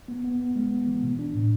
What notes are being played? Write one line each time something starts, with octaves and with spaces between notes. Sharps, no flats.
B3
B3
B3
G#3
B3
E3
B2
D4
A2